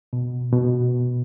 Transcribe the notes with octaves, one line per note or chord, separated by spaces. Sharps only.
B2
B2